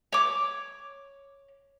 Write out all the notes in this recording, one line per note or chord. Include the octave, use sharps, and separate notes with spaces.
C#5 D6